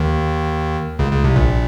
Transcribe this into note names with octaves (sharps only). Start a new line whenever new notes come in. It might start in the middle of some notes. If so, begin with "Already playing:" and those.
Already playing: D#2 D#3
C#2 C#3
C#2 C#3
C2 C3
A#1 A#2